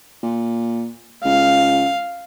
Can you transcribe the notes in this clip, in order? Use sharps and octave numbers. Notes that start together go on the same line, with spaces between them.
A#2
C#2 F5